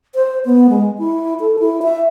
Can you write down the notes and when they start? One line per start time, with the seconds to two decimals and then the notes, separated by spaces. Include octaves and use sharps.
0.15 C5
0.45 B3
0.70 G#3
0.99 E4
1.40 A4
1.59 E4
1.83 E5